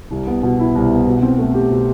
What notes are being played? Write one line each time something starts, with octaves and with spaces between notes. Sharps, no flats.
C2
B3
B2
E4
C2
B3
B2
C4
A3
G4
B2